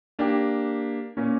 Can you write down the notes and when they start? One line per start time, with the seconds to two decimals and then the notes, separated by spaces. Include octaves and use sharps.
0.19 A#3 D4 G4
1.17 A#2 A#3 C#4